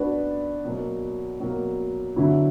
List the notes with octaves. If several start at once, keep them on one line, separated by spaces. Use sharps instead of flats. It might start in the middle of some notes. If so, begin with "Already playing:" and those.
Already playing: B3 D4 F#4 B4 D5
B2 F#3 A#3
B2 F#3 A#3
D3 F#3 B3 E4